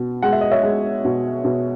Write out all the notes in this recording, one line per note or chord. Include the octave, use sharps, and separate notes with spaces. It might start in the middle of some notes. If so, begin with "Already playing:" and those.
Already playing: B2
G#3 F#5
E5
D#5
C#5 E5
G#3
B2
B2